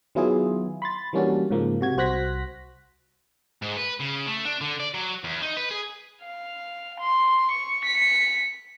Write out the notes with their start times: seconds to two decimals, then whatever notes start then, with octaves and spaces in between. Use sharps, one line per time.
0.15 D#3 F#3 B3 E4 F4 G#4
0.82 B5 C6 A6
1.13 E3 G3 A#3 C#4 D4 F#4
1.51 G#2 C#3 F3 A#3
1.81 C3 F#4 G#6
1.97 C2 F#4 C5 F#6 A#6 B6
3.62 G#2
3.77 B4
4.00 C#3
4.26 A3
4.45 D4
4.61 D3
4.80 D5
4.94 F#3
5.24 E2
5.42 D#4
5.57 B4
5.70 G#4
6.24 F5
7.00 C6
7.51 C#6
7.84 B6 C#7